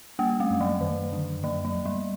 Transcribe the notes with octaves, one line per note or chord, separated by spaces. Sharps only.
G3 A#3
A3
F#2
F#3
F#2 D#3
D3
F#2 F#3
F#3
F#2
G3